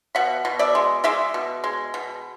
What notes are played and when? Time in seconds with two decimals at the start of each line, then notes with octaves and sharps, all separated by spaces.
0.15 B2 E5 F#5
0.45 B2
0.59 D5 E5
0.75 G#3
1.04 G#3 D5 E5
1.34 B2
1.64 G#3
1.94 B2